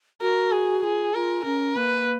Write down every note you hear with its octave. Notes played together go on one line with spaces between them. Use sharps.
F#4 A#4
G#4
F4 G#4
F4 A#4
C#4 A#4
A#3 B4